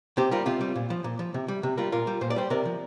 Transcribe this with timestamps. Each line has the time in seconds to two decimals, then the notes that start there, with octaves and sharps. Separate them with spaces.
0.17 C3 G4 C5
0.31 G3 F4 A#4
0.46 C3 C4 F4
0.61 G3
0.76 A#2
0.90 F3
1.04 A#2
1.19 F3
1.34 C3
1.48 G3
1.63 C3
1.77 G3 F4 A#4
1.92 A#2 F4 A#4
2.07 G3
2.21 A#2 C5
2.30 D5
2.36 G3 G4 C5
2.50 C3 A#4 D5
2.65 F3